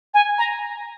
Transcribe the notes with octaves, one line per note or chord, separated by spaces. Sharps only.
G#5
A#5